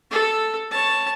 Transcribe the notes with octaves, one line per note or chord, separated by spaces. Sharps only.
A4
C#5 A5